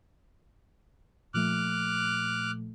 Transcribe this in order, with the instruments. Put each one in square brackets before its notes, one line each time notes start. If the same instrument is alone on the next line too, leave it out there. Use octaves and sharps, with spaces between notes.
[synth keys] A#2 F3 A3 [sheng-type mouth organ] D6 F6 F#6